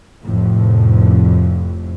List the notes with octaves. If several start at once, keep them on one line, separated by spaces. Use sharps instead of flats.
F1 F2 A2